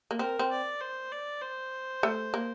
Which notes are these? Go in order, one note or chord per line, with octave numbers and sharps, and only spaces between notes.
A#3
C4 A#4
C4
D5
C5
D5
C5
A3
A#3